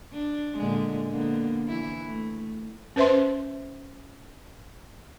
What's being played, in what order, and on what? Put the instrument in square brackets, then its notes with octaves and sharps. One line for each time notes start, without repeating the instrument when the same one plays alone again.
[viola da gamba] D4
A#2 D3 G#3
D3 A#3 B3
E3 E4
A3
[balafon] C#4 B4 C5 E5 C6